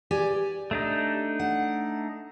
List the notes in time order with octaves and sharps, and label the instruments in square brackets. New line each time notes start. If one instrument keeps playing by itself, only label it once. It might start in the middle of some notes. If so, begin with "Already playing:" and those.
[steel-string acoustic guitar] G4 D5 G#5
[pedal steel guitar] A3 D4 D#4
[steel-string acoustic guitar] F#5